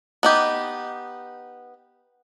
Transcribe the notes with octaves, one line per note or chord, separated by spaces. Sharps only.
B3 D#4 G4